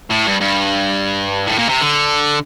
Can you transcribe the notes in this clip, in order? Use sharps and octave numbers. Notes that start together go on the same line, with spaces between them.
A2
G2
G2
A2
A#2
C3
D3